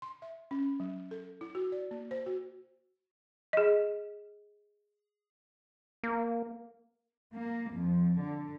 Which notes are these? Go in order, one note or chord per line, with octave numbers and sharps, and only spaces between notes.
C6
E5
C#4
F#3
A4
E4
F#4
D5
A#3
C5
F#4
G#4 D#5
A#3
A#3
F2
D3